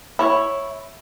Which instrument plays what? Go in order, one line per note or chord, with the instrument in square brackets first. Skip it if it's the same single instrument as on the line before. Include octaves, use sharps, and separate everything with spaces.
[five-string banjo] E4 C#5